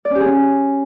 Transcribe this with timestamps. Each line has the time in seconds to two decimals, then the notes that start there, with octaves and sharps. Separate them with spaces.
0.05 D5
0.10 C#4
0.15 G4
0.20 G#4
0.25 C#4